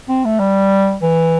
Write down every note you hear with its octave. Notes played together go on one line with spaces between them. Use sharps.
C4
A3
G3
E3